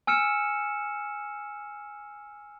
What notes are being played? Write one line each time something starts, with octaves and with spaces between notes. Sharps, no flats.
G#5 E6 F6 C#7 E7